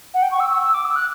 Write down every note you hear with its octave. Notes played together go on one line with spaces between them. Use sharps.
F#5
G5
C#6
E6
E6
E6
D6
E6
F#6